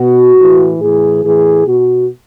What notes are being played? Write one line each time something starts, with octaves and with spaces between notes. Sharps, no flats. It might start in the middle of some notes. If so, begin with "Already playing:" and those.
Already playing: B2 F#4
A2 E3
A2 E3 G#4
A2 E3 G#4
B2 F#4